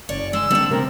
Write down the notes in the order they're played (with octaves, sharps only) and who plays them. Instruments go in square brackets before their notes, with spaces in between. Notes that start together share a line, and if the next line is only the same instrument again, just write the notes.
[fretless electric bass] F#1 [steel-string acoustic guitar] C#5 [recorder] D5
[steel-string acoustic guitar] G#3 [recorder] E6
[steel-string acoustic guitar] D3 D4 [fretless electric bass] G3 A#3 C4
[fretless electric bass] C3 A3 C4 [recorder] A#4